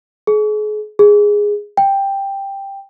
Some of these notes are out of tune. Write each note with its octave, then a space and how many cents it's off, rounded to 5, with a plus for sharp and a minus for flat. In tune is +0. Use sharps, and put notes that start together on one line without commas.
G#4 +40
G#4 -5
G5 +5